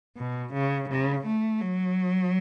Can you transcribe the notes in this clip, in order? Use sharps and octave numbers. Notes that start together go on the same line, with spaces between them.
B2
C#3
C#3
A3
F#3